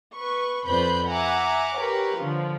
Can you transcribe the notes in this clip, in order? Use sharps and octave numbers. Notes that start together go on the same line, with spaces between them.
B4 C#6
F2 B4 C5 D5 B5 G6
E5 F#5 G#5 A#5 D6
G4 A#4 B4 C#5
D3 F3